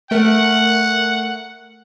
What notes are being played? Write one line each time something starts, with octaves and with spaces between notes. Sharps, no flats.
A3 A#4 F#5